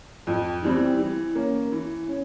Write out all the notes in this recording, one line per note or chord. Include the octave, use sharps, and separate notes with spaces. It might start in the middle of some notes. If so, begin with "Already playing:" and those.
F2
E3 G3 C4
E3
A#3 C#4
E3
C#4